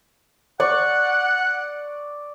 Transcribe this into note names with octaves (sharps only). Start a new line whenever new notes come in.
D5 F#5 C#6